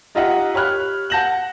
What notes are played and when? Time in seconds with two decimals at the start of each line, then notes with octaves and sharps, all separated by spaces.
0.15 D#4 F4 G4 D#5 E5 F#5
0.54 G4 C#5 B5 F6 F#6
1.10 F#5 A5 G6 A#6 E7 F#7